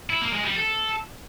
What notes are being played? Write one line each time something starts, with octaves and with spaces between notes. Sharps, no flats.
E4
A#3
G#3
G3
A4